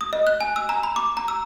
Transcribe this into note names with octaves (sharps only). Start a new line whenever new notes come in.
D#6
D#5
F#6
G#5
E6
A#5
B5
D6
A#5
E6